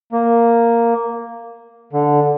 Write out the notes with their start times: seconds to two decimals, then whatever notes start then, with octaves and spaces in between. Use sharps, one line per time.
0.12 A#3
1.93 D3